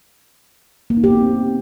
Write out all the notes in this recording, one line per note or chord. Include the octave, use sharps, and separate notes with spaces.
A#3
D#4
G4
B3
C4